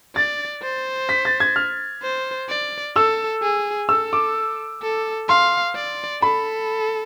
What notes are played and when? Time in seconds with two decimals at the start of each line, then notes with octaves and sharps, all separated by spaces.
0.16 D5 A6
0.63 C5
1.09 B6
1.25 A6
1.40 G#6
1.56 F6
2.03 C5
2.49 D5
2.96 A4 E6
3.42 G#4
3.89 A4 E6
4.13 D6
4.82 A4
5.29 F5 C6
5.75 D5
6.22 A4 B5